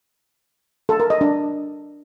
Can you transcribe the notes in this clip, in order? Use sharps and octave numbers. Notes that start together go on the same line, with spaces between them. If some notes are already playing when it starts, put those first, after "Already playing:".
A4
A#4
D#5
D4